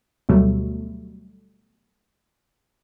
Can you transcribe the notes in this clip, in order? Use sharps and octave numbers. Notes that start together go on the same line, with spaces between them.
D2 B2 F#3 G3 A3